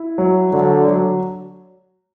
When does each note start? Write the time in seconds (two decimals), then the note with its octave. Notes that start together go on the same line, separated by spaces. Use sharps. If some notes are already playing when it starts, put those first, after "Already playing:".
Already playing: E4
0.18 F#3
0.52 D3 F#3
0.88 F#3